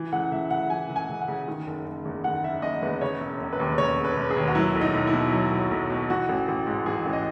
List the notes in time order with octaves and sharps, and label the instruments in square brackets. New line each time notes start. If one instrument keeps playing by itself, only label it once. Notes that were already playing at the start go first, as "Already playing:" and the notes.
Already playing: [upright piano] E3
C#2 F#5
C#2 E5
C#3 F#5
E3 G#5
C#2
G#5
C#2
F#5
C#3
D#3
F#1
F#1
E2
D#3 F#5
F#1 E5
F#1 D#5
E2 B4
C#3 C#5
E1
E1
B4
D#2
C#3 C#5
E1
B4
E1
G#4
D#2
F#4
F#3 E4
B1
D#4
B1
E4
B2
F#3
B1
B1
B2
E3 F#4
A1
A1
G#2
E3 G#4
A1
D#5